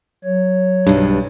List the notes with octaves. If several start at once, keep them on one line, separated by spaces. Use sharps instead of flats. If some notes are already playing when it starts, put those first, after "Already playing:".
F#3 C#5
B1 G2